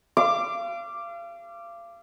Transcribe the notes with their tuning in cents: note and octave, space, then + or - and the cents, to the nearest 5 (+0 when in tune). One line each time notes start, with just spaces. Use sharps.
F5 -35 D6 +0